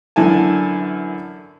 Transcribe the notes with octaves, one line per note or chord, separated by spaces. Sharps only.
F#2 D3 E3 G#5 A5